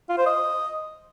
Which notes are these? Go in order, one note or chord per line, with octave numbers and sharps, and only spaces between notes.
F4
C5
D#5